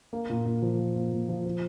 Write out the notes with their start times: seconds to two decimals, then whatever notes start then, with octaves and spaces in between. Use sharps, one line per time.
0.13 A#3
0.29 A#2
0.46 A#2
0.62 F3
0.79 A#3
0.96 A#2
1.12 A#2
1.29 F3
1.46 F3